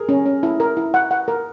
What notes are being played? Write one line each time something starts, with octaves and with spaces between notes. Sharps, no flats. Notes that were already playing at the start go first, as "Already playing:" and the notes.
Already playing: G#4 A#4
C#4
C#4
E4
A#4
E4
F#5
F#5
A#4